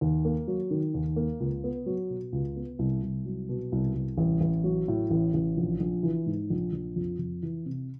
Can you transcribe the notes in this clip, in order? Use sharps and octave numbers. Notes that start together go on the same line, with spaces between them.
D#2
A#3
F#3
D#3
D#2
A#3
C#2
B3
F#3
B2
C#2
B3
C2
C2
F#3
B2
C2
C2
A1
A1
F#3
A2
A1
A1
A#1
A#1
E3
G#2
A#1
A#1
F2
F2
E3
C3